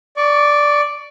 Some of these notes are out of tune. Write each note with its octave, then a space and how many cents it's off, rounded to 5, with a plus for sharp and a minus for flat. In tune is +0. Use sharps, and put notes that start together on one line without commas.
D5 +0 C#6 +30